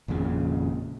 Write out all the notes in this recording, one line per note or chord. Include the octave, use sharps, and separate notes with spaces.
G#1 F2 A#2 C#3